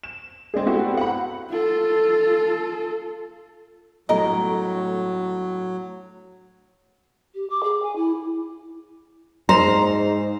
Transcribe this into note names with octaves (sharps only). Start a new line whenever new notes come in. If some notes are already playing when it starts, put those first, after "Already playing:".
E7
G#3 C4 D4 G#4
B3 C4 E4 F#4 G4 A4
F#5 B5
F4 A4
G1 A2 F#3 A3 A#4 D#5
G4
D6
G#4
G#5
E4
G#2 C5 A#5